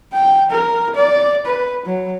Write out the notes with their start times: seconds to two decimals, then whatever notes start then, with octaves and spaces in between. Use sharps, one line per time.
0.13 G5
0.51 A#4
0.95 D5
1.46 B4
1.86 F#3